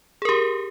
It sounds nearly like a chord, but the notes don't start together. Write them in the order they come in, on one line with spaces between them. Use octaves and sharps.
G#4 A#4 G4